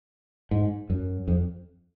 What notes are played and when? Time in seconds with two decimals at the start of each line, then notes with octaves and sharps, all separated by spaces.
0.51 G#2
0.90 F#2
1.28 F2